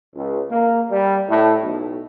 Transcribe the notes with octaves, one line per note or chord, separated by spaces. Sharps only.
C#2
A#3
G3
A2
B1